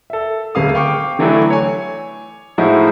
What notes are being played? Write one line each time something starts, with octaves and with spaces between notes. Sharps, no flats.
A4 E5
G#1 D2 C#3 F5 D#6
F5 G5 C#6 D6
D3 E3 F#3 A3 D4 E4
C#5 G#5
A2 F3 G#3 D#4 E4 F#4